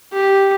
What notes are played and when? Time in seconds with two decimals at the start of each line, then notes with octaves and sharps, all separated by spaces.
0.13 G4